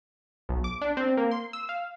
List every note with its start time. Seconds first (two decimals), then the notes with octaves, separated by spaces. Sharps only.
0.49 B1
0.64 D6
0.81 D4
0.97 C4
1.17 A#3
1.31 C6
1.53 E6
1.69 F5